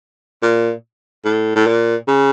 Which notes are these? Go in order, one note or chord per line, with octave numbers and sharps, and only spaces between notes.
A#2
A2
A2
A#2
C#3